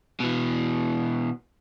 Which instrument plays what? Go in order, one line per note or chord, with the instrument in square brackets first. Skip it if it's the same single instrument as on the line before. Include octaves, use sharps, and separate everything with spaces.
[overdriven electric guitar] B2 E3